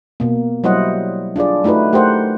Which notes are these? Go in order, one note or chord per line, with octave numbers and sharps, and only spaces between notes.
B2 A#3
F#3 G3 E4 C5 D#5 F#5
D4 F4 G#4 D5
A3 D#4 E4 F#4 B4
A3 G4 A#4 C5 F#5